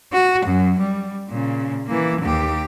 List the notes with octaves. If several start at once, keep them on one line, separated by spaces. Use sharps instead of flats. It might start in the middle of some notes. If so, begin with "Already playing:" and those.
F#4
F#2
G3
A#2 C#3
E3 A#3
D#2 G4